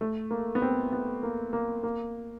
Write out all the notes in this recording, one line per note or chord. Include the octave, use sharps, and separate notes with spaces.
A3
A#3
B3
C4
B3
A#3
A#3
A#3